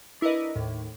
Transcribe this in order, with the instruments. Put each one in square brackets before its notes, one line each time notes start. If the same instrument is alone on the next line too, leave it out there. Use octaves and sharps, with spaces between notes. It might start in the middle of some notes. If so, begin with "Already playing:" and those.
[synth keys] D4 E4 A#4 B4 D#5
D#2 A2